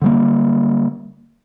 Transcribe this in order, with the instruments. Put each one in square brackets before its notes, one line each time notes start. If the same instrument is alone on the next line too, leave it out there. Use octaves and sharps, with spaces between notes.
[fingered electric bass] D3 G3 A#3